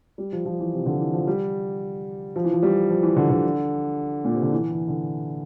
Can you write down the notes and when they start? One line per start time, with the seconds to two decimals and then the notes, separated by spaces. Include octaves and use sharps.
0.18 G3
0.32 F3
0.46 F3
0.60 E3
0.73 C3
0.86 D3
0.99 E3
1.13 F3
1.27 G3
2.36 F3
2.44 E3
2.53 F3
2.63 G3
2.90 F3
3.02 E3
3.16 D3
3.30 D3
4.25 A#2
4.34 C3
4.42 D3
4.52 E3
4.71 E3
4.88 D3